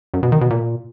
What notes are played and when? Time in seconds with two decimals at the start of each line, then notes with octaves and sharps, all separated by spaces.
0.14 F#2
0.23 B2
0.32 D#3
0.41 B2
0.50 A#2